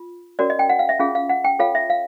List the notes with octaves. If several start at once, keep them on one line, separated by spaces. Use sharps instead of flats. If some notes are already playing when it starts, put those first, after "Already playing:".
Already playing: F4
C#4 F#4 A#4 C#5 D5
D#5
G5
F#5
F5
E5
C#4 F4 G#4 F5
F5
F#5
G5
F4 A4 C#5 F5
E5
F5